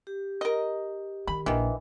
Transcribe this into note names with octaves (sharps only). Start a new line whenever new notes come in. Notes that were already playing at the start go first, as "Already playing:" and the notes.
G4
A#4 D#5
D#3 B5
A#1 D#3 E3